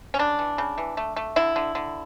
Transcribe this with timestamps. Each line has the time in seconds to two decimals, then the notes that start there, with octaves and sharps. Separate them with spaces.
0.14 C#4
0.19 C#3 D4
0.39 E3
0.58 C#3
0.78 E3
0.97 A3
1.16 A3
1.36 D3 E4
1.56 D3
1.75 D3